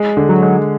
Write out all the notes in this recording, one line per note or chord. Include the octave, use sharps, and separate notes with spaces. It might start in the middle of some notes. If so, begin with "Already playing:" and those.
Already playing: G#3
D3
F#3
G#3